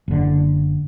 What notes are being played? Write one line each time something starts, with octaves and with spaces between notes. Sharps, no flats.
F#1 D3